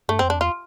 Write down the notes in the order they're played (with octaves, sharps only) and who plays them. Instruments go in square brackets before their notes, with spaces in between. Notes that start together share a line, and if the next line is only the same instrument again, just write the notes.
[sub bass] G2 [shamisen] A3
[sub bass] F2 [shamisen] C4
[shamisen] D4
[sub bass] E2 [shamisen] F4